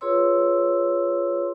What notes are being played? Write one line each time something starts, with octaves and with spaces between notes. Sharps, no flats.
F4 G#4 B4 C#5 C6 E6